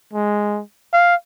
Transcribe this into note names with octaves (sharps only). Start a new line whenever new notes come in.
G#3
F5